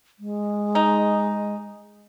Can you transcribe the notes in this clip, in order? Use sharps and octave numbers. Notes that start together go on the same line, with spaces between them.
G#3
D#4